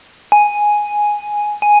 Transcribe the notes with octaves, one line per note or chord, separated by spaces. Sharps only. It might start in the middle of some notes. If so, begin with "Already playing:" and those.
G#5
G#5